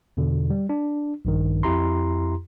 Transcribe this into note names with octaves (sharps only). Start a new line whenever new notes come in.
E2 B2 D3
G3
D4
A#1 G2 D#3
F2 E4 G4 A#5 C6